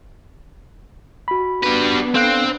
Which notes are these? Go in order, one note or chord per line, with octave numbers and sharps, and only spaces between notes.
F#4 B5
G3 B3 D4 B4
C4 A4 F5 F#6